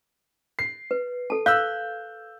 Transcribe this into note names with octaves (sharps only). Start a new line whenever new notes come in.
C7
B4
A4 A5
F5 E6 F#6 G6